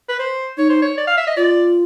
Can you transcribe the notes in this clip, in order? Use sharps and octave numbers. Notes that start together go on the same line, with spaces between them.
B4
C5
D#4 C#5
C5
C#5
D5
F5
E5
D#5
F4 D5